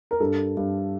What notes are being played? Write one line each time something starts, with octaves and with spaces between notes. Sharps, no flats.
A#4
G2 A4
G2